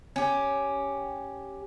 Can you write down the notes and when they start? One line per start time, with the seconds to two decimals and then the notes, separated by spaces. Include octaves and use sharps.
0.16 C#4 G4